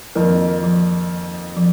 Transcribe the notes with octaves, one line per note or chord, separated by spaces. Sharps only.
F2 D#3 F3 A#3 D#4 A#4
F3
F3